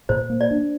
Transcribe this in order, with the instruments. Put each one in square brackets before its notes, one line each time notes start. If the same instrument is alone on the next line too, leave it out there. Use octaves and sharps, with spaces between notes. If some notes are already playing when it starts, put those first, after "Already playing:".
[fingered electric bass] A#2 [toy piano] C5
[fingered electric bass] A#3
[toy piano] D5
[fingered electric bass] D4